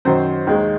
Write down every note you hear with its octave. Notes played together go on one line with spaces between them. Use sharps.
F#2 D#3 F#3 C5
D#2 D#3 G#3